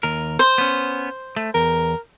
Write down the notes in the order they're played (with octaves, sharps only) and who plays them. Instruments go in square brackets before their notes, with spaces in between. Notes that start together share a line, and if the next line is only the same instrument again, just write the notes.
[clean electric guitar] D#2 A#4
[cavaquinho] C5
[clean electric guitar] B3 C#4
A3
[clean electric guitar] E2 [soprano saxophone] A#4